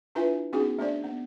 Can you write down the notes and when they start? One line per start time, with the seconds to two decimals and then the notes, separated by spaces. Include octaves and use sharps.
0.15 D4 E4 F4 B4 E5 G#5
0.53 B3 C#4 D#4 F#4 G#4
0.79 A3 D4 C5 D5
1.03 B3